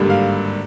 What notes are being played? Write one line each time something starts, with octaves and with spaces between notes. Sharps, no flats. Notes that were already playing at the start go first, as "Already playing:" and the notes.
Already playing: G#1 G2 D3 G3 A#3
F5